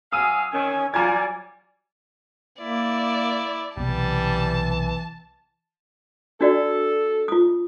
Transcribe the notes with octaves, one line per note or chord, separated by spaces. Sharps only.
F#3 F5 G#5 D#6 E6 D#7
D#3 C#4 G#5
F#3 G3 F4 D5 G#5 A#5 G#6
A#3 E4 D5
B1 C3 E3 G3 B3 A5
D4 F#4 A4 D5
F4 D#6